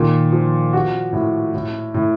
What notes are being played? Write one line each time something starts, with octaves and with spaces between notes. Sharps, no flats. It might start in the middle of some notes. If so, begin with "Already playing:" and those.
Already playing: A#2 D#3
F3
F#4
A2
A2
A2